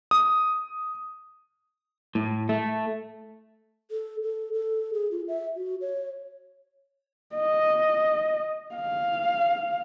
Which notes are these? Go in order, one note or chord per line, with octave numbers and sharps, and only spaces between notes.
D#6
A2
A3
A4
A4
A4
G#4
F4
E5
F#4
C#5
D#5
F5